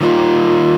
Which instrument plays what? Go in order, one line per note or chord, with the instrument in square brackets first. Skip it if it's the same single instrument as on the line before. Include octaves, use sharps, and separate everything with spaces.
[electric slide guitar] D#3 G3 A#3 D#4 [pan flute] F4